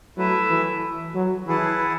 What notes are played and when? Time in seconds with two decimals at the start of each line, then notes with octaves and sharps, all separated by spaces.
0.17 F#3 A3 E4 B4 E5
0.49 E3
1.15 F#3
1.47 E3 E4 G#4 B4 F#5 A5